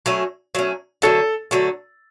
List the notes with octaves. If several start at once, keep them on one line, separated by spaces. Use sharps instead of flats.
F#3 A3 C#4
F#3 A3 C#4
D3 F#3 A3 A4
D3 F#3 A3